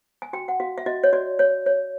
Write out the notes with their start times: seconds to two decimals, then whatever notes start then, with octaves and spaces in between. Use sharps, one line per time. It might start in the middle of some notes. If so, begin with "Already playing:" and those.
0.22 G#5
0.33 F#4 G5
0.48 F#5
0.60 F#4 F5
0.78 E5
0.86 F#4 D#5
1.04 C#5
1.13 F#4 D5
1.39 C#5
1.66 C#5